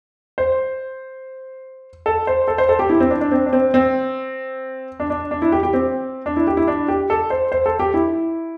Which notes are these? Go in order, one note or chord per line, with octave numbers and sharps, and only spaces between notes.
C5
A4
C5
A4
C5
A4
G4
E4
C4
D4
D4
C4
D4
C4
C4
D4
D4
D4
E4
G4
G4
C4
D4
E4
G4
E4
D4
G4
A4
C5
C5
A4
G4
E4